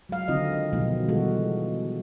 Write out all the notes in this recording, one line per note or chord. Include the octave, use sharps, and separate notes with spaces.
F#3 G#3 F5
D3 D#3 C4 D#4 F4 D#5
B2 D#3 F3 F#3 G#3 B3
E3 G3 G#3 F4 F#4 A4